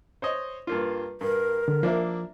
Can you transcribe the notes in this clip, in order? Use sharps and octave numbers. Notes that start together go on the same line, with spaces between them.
C5 C#5 D#5
G2 A#3 F4
G2 A#4
D3
F3 A#3 D4 E4